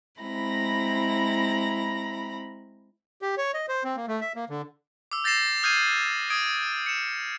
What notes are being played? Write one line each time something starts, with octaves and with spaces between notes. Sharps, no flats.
G#3 C4 E4 A#5 B5 A#6
G4
C#5
D#5
C5
C4
A#3
A3
E5
A#3
D3
D6 E6
G6 A6 A#6 C7 E7
D#6 F6 G6 G#6 C7 D#7
D#6 G#6 D7
C#7 E7